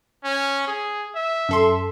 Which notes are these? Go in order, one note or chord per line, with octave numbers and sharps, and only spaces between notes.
C#4
G#4
E5
F#2 A4 C6